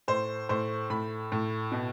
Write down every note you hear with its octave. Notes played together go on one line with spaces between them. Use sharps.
A2 C5
A2 C5
A2 B5
A2
B2